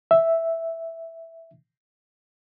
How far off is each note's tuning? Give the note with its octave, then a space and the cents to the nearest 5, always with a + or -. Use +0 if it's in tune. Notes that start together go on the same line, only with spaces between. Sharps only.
E5 +0